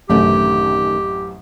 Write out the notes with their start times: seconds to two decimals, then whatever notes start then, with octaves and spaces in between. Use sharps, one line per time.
0.10 A1 F#2 C3 D#3 A3 C#4 G4